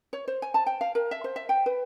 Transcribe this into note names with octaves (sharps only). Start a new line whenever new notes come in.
C#5
C5
G#5
A5
G5
F5
A#4
E5
C5
E5
G5
B4